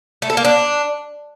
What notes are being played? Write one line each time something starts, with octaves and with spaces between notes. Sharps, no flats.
A3
A4
A#3
D4